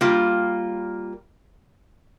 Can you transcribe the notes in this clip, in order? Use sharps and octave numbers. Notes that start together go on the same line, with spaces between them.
G3 A#3 F4